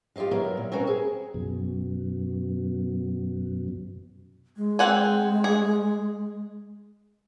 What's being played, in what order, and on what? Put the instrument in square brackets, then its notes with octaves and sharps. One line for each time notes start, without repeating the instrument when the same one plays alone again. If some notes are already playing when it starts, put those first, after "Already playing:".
[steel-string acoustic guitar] F4 G4 G#4 D#5 F5
F#3 B3 E4 A#4
A#2
C4 C#4 F#4 A#4 B4
G#4
[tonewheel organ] F#2 B2
[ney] G#3
[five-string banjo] C4 F#5 G#5
G#4